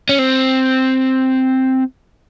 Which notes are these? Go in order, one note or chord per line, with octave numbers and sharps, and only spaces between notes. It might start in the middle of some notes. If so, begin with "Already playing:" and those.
C#4
C4